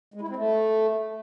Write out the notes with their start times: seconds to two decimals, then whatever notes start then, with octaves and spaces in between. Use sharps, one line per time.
0.14 G#3
0.21 E4
0.29 C4
0.36 A3